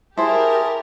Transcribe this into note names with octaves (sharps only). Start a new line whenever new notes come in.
E4 G4 G#4 A#4 C5 A5